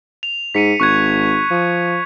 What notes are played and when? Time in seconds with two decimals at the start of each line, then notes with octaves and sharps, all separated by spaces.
0.23 F7
0.54 G#2 B6 C#7 D#7
0.80 G#1 C#6 F#6 G#6
1.50 F3